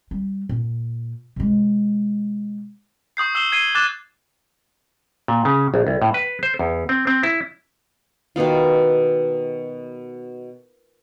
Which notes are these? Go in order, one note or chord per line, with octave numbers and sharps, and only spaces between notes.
G3
A#2
B2 G#3
C#6 D#6 G6 C7
E6 C7 E7 G7
G#6 C7 D#7 G7
D6 F#6 A6 E7
A#2
C#3
A#1
C2
A2
B4
C5
E2
C4
C4
E4
B2 D#3 B3 F4